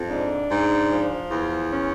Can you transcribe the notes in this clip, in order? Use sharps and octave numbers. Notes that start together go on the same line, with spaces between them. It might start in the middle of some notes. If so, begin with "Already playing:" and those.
Already playing: F2
G#2 D4
G#2
F3
E2
C#4